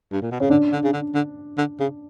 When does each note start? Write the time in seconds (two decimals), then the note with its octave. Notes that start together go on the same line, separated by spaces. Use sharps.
0.12 G2
0.22 A#2
0.31 B2
0.40 C#3 C#4
0.50 D3 D4
0.72 D3
0.84 C#3
0.93 D3
1.14 D3
1.58 D3
1.80 C#3